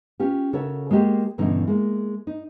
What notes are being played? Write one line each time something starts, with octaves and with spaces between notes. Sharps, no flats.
C#4 F4 G4
C#3 F#4 A4 A#4 C#5 E5
G#3 A#3 F#4 G4
G2 B2 D3 E3 C#4 D#4
G#3 A#3
D#4